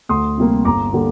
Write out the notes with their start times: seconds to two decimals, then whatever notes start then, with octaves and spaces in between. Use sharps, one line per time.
0.09 D2 C6 D#6
0.38 C3 G3 A#3
0.65 G1 A#5 D6
0.93 D3 G3 A#3